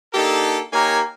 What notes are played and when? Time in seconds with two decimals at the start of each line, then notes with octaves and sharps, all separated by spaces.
0.14 A#3 D4 D#4 G4 A4
0.73 A#3 D#4 G4 A#4 C#5 G#5